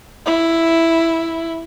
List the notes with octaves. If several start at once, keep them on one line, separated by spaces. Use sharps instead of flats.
E4